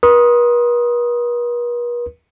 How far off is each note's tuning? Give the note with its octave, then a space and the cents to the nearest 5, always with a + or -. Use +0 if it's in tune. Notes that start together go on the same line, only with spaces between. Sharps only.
B4 -45 C6 +20 D#6 +0